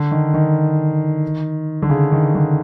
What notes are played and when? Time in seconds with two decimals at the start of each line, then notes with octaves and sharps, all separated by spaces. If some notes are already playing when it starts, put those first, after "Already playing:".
Already playing: D3
0.11 D#3
0.34 D#3
1.82 D3
1.90 C#3
2.12 D#3
2.35 D3